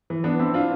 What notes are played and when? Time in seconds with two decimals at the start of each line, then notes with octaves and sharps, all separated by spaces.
0.10 E3
0.24 B3 D4
0.39 C4 E4
0.54 D4 F4